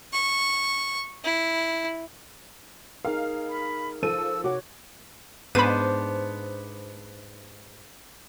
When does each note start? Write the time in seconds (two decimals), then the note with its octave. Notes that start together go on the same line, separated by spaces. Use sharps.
0.13 C#6
1.25 E4
3.05 D#4 G#4 A#4 F5
3.49 B5
4.03 F3 A4 E6 D#7
4.44 C3 F#4 C#5 D6
5.55 G#2 B3 D4 C5 B5 D#7